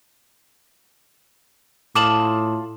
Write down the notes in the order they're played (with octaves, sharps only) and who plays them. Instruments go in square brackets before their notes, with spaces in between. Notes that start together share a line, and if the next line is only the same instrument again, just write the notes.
[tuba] A2 [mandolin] F4 A5 D#6 [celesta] D6 E7 F#7